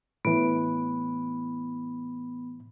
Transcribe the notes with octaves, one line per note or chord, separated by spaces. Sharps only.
A2 E3 B3